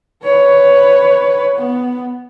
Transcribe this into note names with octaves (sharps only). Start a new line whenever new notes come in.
B4 C#5
B3